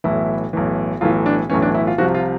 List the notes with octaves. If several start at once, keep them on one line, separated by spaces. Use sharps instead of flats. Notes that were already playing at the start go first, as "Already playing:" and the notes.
B1 A2 E3 E4
B1 A2 E3
B1 A2 E3 F4
D4
B1 A2 E3 C#4
D4
E4
F4
C2 C3 F3 F#4
F4